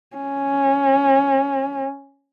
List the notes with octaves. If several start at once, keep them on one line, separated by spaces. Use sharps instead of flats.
C#4